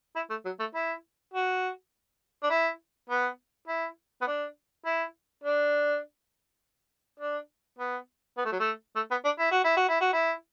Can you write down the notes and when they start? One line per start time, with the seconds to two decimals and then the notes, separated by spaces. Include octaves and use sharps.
0.16 E4
0.30 A3
0.45 F#3
0.59 A3
0.75 E4
1.34 F#4
2.43 D4
2.50 E4
3.10 B3
3.68 E4
4.22 B3
4.27 D4
4.86 E4
5.44 D4
7.20 D4
7.79 B3
8.38 B3
8.45 A3
8.52 F#3
8.60 A3
8.96 A3
9.11 B3
9.25 D4
9.39 E4
9.52 F#4
9.65 E4
9.77 F#4
9.89 E4
10.01 F#4
10.13 E4